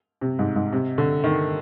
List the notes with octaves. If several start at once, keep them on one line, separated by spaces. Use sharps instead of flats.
C3
G#2
G#2
C3
D3
D#3